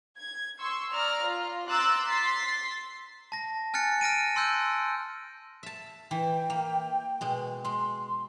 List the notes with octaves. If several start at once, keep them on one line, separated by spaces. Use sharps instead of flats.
G#6
C6 C#6 E6
D5 A#5 F6
F4
A#5 C6 D6 E6 F#6 A6
C6 A6 B6 C7
A5 A#6
G#5 F6 F#6 A6 C#7
F6 A#6 D7 D#7
A5 C6 E6 F#6 G6
E5 A5
E3 G5
A#3
B2 G#3
G#3 C6